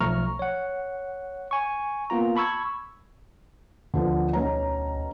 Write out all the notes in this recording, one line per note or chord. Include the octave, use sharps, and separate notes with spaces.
B1 F3 A3 A#5 C#6 F6
C#5 F#5
G#5 C#6
A#3 B3 F4 A#5
A5 B5 C#6 E6 G#6
D2 D3 F3 B3
B1 C#4 A#5